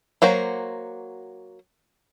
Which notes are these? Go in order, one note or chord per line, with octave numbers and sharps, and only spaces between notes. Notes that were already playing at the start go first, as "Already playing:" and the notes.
F#3 A#3 F#4 C5